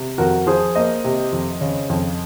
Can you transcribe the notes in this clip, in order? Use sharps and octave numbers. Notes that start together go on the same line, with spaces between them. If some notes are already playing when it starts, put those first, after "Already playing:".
Already playing: C3
F2 F#4 A#4
F3 G#4 C5
A#3 C5 D#5
C3
F2
C#3
F2